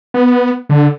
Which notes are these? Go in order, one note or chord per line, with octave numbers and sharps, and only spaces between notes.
B3
D3